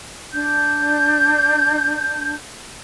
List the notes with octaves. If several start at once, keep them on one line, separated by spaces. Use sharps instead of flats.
D4 G6